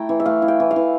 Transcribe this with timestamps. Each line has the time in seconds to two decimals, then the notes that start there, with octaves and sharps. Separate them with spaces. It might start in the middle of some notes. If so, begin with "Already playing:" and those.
Already playing: A3 E4 G5 A#5
0.09 E3
0.20 E5
0.26 A3 F5
0.42 E4
0.48 G5
0.60 E3
0.71 F5
0.76 E3